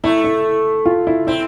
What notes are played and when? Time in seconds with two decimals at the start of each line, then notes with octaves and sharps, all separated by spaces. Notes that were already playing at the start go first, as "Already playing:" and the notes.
0.04 A3 E4
0.24 E4
0.86 F4
1.07 E4
1.27 C4 E4